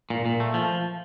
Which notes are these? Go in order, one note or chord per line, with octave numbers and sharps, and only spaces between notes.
A#2
A#2
A3
F3